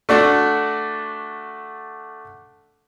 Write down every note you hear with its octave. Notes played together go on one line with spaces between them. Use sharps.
A3 D4 F#4